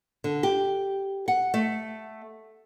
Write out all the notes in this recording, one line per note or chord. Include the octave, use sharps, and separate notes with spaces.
D3
G4
F#5
A3